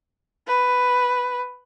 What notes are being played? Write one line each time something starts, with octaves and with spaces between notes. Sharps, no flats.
B4